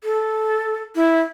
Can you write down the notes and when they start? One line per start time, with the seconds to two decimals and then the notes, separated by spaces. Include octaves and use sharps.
0.04 A4
0.95 E4